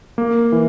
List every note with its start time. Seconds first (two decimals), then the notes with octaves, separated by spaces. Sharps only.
0.18 A#3
0.52 E3